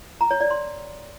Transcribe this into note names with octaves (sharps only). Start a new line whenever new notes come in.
A#5
C#5
D5
C6